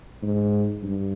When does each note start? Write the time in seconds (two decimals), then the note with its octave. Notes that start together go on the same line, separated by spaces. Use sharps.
0.22 G#2
0.83 G2